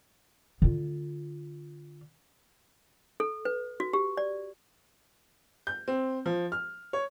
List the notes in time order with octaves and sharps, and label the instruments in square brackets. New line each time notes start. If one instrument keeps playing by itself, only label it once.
[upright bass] D3 F4
[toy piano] A4
B4
F#4
G4
D5
[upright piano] G6
C4
F3
F6
C#5